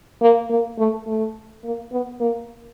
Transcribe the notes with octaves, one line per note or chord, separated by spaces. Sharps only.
A#3
A#3
A3
A3
A#3
B3
A#3